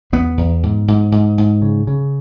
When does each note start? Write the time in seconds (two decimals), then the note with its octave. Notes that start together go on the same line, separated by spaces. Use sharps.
0.13 E2 B3
0.38 E2
0.63 G#2
0.88 G#2
1.12 G#2
1.38 G#2
1.62 C#3
1.87 C#3